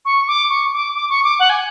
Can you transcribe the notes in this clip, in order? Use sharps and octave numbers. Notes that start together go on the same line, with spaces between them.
C#6
D6
C#6
D6
D6
C#6
D6
F#5
G#5